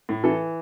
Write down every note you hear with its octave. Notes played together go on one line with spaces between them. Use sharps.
A2
E3 A4